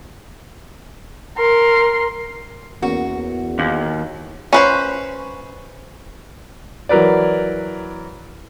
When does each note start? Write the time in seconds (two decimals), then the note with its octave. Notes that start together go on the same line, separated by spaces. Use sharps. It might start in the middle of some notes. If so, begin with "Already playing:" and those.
1.37 A#4 C6
2.82 E2 A#3 C#4 F#4 A#4
3.59 D#2
4.53 C#4 B4 C5
6.89 E3 F#3 A#4 B4 D5